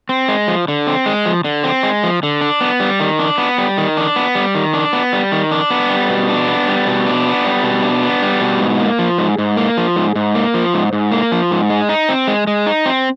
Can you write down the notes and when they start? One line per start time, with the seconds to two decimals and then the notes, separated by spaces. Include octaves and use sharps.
0.09 C4
0.28 G#3
0.48 F3
0.68 D3
0.87 C4
1.06 G#3
1.25 F3
1.45 D3
1.64 C4
1.83 G#3
2.04 F3
2.23 D3
2.41 D4
2.61 B3
2.80 G3
3.00 D#3
3.19 D4
3.38 B3
3.58 G3
3.78 D#3
3.97 D4
4.16 B3
4.35 G3
4.55 D#3
4.73 D4
4.93 B3
5.13 G3
5.32 D#3
5.51 D4
5.70 B3
5.90 G3
6.10 B2
6.29 D4
6.48 B3
6.68 G3
6.87 B2
7.07 D4
7.25 B3
7.45 G3
7.63 B2
7.83 D4
8.02 B3
8.22 G3
8.41 B2
8.60 G#2
8.80 A#3
8.99 F3
9.18 G#2
9.38 G#2
9.57 A#3
9.77 F3
9.96 G#2
10.15 G#2
10.35 A#3
10.54 F3
10.74 G#2
10.93 G#2
11.11 A#3
11.32 F3
11.51 G#2
11.70 G#3
11.89 D#4
12.09 C4
12.28 G#3
12.47 G#3
12.67 D#4
12.86 C4